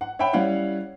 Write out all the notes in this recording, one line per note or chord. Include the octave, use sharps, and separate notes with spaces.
F#5
C#5 E5 F#5 G5 B5
G3 C#4 E4 C#5 F5 F#5